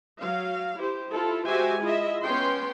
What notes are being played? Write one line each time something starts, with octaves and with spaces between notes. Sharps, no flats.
F#3 F5
E4 G4 C5
E4 F4 A4
G#3 F#4 G4 C5 E5 G#5
E4 F4 G#4 D#5 E5
B3 C#4 G5 C6